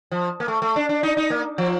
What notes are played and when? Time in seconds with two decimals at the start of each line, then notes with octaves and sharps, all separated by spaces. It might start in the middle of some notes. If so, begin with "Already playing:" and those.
0.11 F3
0.40 A#3
0.48 A3
0.62 A3
0.76 D4
0.89 D4
1.03 D#4
1.17 D#4
1.30 A#3
1.58 F3